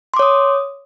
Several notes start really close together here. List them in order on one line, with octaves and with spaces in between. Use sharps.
C6 D6 C#5 D#6